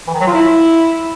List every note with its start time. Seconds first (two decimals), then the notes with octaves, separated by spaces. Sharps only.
0.07 E3
0.14 D#3
0.20 F#3
0.27 F4
0.33 E4